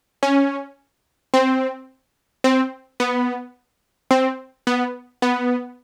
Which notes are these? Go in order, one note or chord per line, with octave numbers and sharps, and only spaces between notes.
C#4
C4
C4
B3
C4
B3
B3